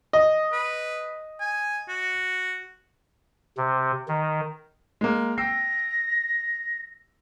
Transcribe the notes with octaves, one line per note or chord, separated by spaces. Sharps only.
D#5
B4
G#5
F#4
C3
D#3
G#3 A#3
G5 E6 A#6 C7